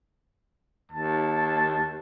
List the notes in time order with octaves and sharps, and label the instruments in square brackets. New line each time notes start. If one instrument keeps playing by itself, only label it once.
[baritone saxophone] D#2 [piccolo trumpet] A5